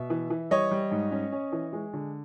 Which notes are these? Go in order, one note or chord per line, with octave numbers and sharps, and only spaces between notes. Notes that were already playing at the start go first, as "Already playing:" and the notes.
Already playing: B2 E5
E3
E3
G3 C#5 D#5
G3
G#2
C#4
C#4
E3
G#3
D3